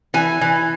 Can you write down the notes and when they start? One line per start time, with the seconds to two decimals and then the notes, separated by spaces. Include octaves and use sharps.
0.14 E3 G#5
0.41 E3